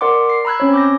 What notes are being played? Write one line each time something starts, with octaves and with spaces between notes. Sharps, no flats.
A#4 D5 F#5 C6 D6
C7
A#5 B5 E6 F#6 G#6
C4 C#4 C#5
D6 G6 A#6